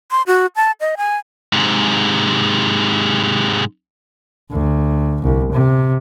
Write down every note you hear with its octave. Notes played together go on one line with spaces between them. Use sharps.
C6
F#4
A5
D#5
G#5
G#2 C3
D2
C2
C3